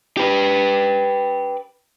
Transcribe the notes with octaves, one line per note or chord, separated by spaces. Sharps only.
G4 B4